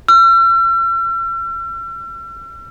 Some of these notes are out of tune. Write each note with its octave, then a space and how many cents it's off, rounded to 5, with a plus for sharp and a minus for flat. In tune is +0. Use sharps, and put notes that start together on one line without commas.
E6 +45